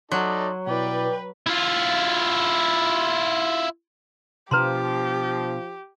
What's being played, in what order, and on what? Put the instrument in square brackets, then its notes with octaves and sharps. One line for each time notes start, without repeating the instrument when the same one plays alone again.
[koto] F#3 [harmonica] D#4 A4 D5 [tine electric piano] C6
[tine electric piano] B2 E4 [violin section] B4 [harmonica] D5 G5
[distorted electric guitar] E4 F4
[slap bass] B2 D4 [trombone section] F3 [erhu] G4 [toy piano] B4 A#5 C6